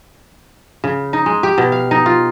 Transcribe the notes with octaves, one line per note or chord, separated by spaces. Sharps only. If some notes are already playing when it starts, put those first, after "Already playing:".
C#3
D#4
G#3
G4
B2
F5
D#4
F4